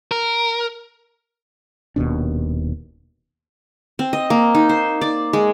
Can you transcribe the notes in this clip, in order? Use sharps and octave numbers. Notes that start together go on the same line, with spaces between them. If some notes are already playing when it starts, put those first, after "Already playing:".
A#4
D#1 D#2 B2 D4
C4
D#5
A#3
D#4
C5
D5
G#3